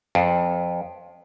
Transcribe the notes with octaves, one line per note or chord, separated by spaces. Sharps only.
F2